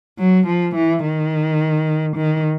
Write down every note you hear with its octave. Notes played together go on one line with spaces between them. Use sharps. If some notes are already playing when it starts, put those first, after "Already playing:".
F#3
F3
E3
D#3
D#3